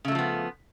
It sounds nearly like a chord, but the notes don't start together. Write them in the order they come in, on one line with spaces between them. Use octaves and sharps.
C#3 A3 F#3 F3 B3